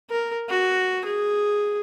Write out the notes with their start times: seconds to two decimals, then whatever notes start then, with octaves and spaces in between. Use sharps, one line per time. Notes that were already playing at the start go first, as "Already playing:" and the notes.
0.10 A#4
0.49 F#4
1.05 G#4